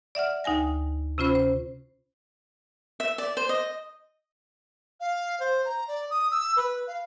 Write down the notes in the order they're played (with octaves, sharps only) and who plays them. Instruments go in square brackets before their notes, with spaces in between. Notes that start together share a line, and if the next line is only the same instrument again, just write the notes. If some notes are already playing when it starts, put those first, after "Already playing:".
[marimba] D5 E5 F#5 F6
D2 D#4 G5 G#5 A#6
C3 C#4 F4 C5 B5
C5
[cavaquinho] E5
D5
C5
D#5
[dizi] F5
C5
A#5
D5
D#6
E6
B4
F5